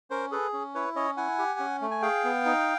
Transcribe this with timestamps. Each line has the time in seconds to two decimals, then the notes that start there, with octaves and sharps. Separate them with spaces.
0.11 C#4 A#4 C5
0.31 G#4 A4 B4
0.53 C#4
0.74 E4 B4 C#5
0.96 C#4 C#5 D#5
1.17 E4 F#5 G#5
1.39 G4
1.59 C#4
1.81 A3
1.91 G#5
2.02 G#4 F5 G5
2.24 B3
2.45 D#4